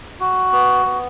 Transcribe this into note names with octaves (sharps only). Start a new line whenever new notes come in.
F#4
B3
B3